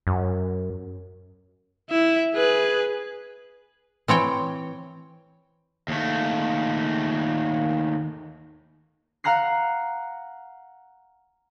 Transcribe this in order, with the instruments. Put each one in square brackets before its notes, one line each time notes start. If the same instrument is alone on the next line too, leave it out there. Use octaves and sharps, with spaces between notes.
[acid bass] F#2
[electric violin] E4 E5
G#4 B4
[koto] E3 C4 C#5 G5
[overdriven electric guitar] D#2 A3
[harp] F5 F#5 A#5 F#6 C7